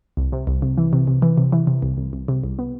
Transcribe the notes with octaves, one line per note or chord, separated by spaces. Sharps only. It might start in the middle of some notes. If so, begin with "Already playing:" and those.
C2
C3
C2
C3
E3
C3
C3
E3
C3
E3
C3
C2
C2
C2
C3
C2
B3